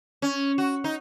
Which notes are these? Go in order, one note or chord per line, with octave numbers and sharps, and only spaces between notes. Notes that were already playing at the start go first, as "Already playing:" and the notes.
C#4
F#4
D#4